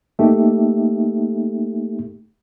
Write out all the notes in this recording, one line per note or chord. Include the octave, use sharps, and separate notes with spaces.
A3 A#3 D#4 G4 A4 E5